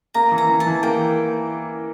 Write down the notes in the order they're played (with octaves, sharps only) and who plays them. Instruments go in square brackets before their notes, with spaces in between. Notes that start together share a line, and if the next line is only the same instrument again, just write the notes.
[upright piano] A#3 [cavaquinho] A#5
[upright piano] E3
[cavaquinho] A#5
[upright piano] E3
[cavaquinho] A5
[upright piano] E3
[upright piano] A#3 [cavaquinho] G5